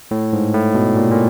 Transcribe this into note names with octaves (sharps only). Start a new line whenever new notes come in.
A2
G#2
A2
B2
A#2
A#2